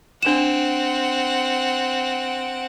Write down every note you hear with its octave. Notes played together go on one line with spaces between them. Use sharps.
C4 D4 F#5 E7